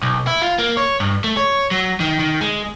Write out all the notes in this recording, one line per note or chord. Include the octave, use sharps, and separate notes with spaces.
B1
E4
F4
A#3
C#5
G2
A3
C#5
F#3
D#3
D#3
G#3